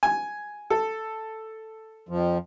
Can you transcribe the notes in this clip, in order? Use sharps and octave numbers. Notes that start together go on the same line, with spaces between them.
G#5
A4
F2 F3